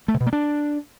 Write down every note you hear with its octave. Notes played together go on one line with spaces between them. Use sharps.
A3
C3
B2
A#3
D4